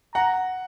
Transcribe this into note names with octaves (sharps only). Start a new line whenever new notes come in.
F#5 A#5